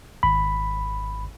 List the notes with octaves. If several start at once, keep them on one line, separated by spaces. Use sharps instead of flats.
G#1 B5